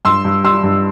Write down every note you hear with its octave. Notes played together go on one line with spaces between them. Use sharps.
G2 C6 E6
G2
G3 C6 E6
G2